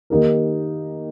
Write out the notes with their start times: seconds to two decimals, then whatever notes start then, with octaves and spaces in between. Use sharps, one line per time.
0.10 D#3 A#3 D#4 G4 A#4